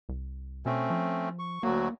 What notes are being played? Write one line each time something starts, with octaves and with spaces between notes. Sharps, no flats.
C2
B2 A3 C4 C#4
F3
C#6
D2 F#3 A#3 F#4